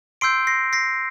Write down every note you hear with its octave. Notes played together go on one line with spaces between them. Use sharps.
C6 E6 G6 C7 D7
A#6 C7
A#6 C7